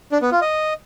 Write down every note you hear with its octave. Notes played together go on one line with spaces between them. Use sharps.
D4
B3
F4
D#5